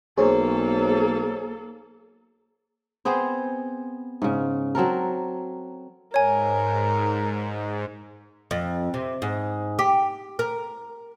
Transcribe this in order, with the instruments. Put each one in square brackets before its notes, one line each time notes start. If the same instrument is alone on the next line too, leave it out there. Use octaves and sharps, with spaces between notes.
[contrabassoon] B1 [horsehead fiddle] A#3 A4 [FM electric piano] G#4 C5 C#5
[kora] B3 C4 G#4 C5
G#2 C#3
F#3 C4 A4 A#4
[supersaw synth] G#2 [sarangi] A#4 [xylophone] C#5 G#5
[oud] F2
C3
G#2
G4
A#4